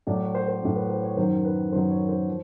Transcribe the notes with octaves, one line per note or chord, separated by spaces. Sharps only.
A2 F#3 D5
C#5
C5
C5
A2 F#3
B4
C5
C#5
F#2 D#3 F#3 C5
B4
F#2 D#3 F#3 C5
C#5
C5
F3